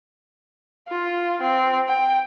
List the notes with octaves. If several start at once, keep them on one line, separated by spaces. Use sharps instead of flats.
F4
C4
G5